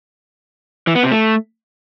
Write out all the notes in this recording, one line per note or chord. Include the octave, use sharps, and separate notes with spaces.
E3
B3
C3
A3